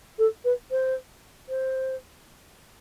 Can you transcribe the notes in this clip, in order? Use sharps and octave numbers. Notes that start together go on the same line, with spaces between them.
A4
B4
C5
C5